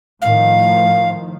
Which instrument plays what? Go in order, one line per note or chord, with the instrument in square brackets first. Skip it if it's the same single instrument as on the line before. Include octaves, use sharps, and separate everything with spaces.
[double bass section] A2 D#3 F3 [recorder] F5